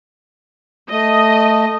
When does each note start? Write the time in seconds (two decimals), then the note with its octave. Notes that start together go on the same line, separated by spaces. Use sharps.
0.90 A3 D#5